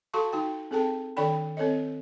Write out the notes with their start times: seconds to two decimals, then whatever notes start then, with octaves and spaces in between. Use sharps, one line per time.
0.14 F#4 A4 F5 A5 C6 C#6
0.33 D#4 F#4 G5
0.71 C4 G#4 A4 G5 A5
1.17 D#3 D4 A4 D5 G5 B5
1.57 C4 A4 C#5 D#5